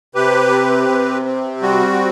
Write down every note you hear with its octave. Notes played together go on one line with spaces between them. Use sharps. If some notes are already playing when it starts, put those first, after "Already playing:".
C3 G4 B4
C4
C3
C4
G3 F#4